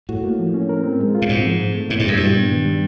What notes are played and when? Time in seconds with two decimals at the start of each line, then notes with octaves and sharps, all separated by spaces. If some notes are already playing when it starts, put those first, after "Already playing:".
0.09 A2 F#4
0.24 A#3
0.39 F3
0.54 C#4
0.69 A#4
0.84 C4
0.99 G#3
1.15 F4
1.22 A2
1.29 G#2 C4
1.45 F3
1.60 A2
1.75 A3
1.90 G#2 E4
2.00 G2
2.06 F#2 G3
2.17 G2 A#2
2.35 B3
2.50 D#3
2.66 G3